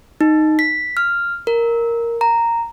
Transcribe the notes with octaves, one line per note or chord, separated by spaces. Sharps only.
D#4
B6
F6
A#4
A#5